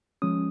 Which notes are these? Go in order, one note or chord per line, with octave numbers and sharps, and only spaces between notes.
F3 G#3 C#4 D#6